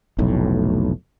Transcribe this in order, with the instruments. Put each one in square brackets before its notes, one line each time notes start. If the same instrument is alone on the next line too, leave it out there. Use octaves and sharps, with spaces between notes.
[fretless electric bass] F1 B1 A2